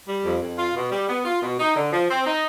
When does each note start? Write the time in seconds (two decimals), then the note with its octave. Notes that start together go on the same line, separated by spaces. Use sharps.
0.08 G3
0.25 F2
0.42 F2
0.58 F4
0.75 B2
0.92 G3
1.09 B3
1.25 F4
1.42 B2
1.59 D#4
1.76 D3
1.92 F3
2.10 C4
2.26 D#4